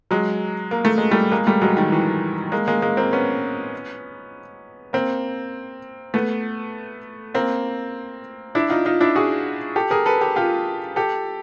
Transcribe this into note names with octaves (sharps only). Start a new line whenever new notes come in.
F#3 G#3
A#3
A3
G#3
G3 A3
G#3 A#3
G3 A3
F#3 G#3
D#3
E3
G#3 A#3
G#3 A#3
G#3 A#3
A#3 C4
B3 C#4
A#3 C4
A3 B3
A#3 C4
D4 E4
D#4 F4
D#4 F4
D4 E4
F#4 G#4
G4 A4
G#4 A#4
A4 B4
G4 A4
F4 G4
G4 A4